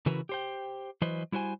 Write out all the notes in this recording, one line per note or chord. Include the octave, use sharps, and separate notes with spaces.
C#3 E3 E4 F#4 A#4 B4
G4 C5 G5
E3 F#3 B4 C5 D#5
G3 E4 F#4 C5 G#5